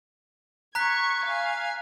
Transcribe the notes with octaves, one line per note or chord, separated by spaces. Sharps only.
A#5 C#6 F#6 G#6 B6
F5 G#5